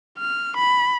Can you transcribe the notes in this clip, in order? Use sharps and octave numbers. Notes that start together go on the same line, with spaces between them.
F6
B5